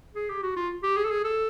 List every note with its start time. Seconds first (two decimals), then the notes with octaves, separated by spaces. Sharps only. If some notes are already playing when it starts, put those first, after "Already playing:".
0.15 G#4
0.29 G4
0.43 F#4
0.56 F4
0.83 G4
0.97 G#4
1.05 A4
1.11 G#4
1.24 A4